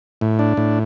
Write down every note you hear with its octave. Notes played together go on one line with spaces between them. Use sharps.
A2
D4
A2